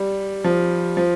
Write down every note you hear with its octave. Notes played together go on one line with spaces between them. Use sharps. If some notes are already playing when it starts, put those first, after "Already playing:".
Already playing: G3
F3
F3